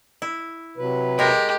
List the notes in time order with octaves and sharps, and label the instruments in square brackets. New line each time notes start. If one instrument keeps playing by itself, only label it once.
[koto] E4
[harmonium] C3 F#3 B4
[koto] G#3 A#4 [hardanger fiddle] G4